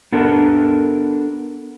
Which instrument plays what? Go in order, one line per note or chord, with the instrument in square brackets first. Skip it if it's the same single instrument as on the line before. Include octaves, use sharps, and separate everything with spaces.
[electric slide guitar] B3 D4 A4 A#4